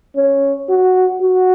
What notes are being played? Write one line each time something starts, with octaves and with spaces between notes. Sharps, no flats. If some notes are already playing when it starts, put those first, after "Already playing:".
C#4
F#4
F#4